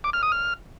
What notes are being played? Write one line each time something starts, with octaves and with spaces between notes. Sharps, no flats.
D6
F6
D#6
F6